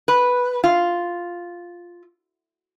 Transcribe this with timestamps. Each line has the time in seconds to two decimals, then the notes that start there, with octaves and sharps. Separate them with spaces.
0.08 B4
0.64 F4